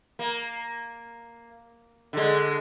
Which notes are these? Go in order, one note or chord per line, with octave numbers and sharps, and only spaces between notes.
A#3
D3 G#3